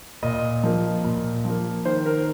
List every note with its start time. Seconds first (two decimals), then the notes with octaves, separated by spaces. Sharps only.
0.23 A#2 D#5
0.63 F3 A#3
1.04 A#2
1.45 F3 A#3
1.85 D#3 C5
2.06 A#4